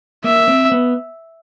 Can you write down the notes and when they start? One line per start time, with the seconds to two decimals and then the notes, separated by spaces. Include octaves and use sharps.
0.24 A#3 E5
0.48 C4
0.72 B3